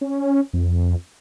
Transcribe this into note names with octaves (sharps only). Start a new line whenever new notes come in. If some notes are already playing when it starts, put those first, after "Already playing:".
C#4
F2